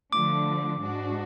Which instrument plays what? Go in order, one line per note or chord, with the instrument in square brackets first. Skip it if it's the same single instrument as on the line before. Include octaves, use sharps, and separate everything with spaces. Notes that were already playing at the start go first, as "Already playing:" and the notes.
[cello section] D3 F3 A3 D4 [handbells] D6
[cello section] G#2 G#3 D4 F#4